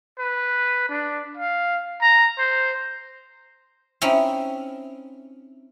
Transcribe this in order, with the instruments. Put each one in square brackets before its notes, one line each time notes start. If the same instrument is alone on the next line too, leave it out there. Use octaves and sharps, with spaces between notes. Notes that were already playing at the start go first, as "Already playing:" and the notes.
[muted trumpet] B4
D4
F5
A#5
C5
[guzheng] C4 C#4 D#4 E4